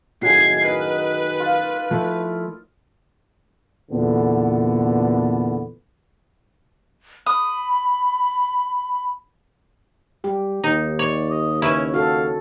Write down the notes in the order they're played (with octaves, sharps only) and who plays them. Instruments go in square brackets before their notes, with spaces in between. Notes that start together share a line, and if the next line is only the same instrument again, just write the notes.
[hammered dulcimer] F#2 A2 D#3 [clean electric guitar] F#4 G#4 [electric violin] G#6 C7
[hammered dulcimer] D#4 A#4 [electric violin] B4
[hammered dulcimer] F4
[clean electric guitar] F3 A3 E4
[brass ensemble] E2 A#2 D3 A3 B3
[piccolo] B5 [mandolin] D#6
[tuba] G3 [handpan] G4
[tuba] D#2 [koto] D#4
[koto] C#5 [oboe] D5
[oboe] D#5
[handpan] C#3 C#5 [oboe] C#4 [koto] E4 B4
[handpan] F#4 A4 [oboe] F5